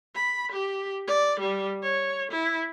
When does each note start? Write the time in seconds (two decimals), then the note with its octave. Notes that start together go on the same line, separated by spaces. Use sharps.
0.15 B5
0.52 G4
1.07 D5
1.40 G3
1.83 C#5
2.31 E4